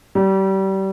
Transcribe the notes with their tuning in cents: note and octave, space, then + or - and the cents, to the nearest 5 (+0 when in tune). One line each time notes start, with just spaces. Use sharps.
G3 -30